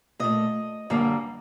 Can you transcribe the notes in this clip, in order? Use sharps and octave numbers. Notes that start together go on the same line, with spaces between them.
A#2 A3 D#5
F#2 D3 G3 A#3